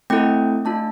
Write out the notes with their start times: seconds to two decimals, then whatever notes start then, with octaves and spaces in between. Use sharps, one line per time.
0.10 A3 C4 E4 A4 G5
0.65 A3 D4 F4 A5